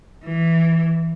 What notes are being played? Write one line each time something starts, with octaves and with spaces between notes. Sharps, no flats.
E3